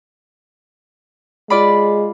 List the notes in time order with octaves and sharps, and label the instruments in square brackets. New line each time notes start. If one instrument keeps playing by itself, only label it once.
[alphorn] G#3 [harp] F4 D5 B5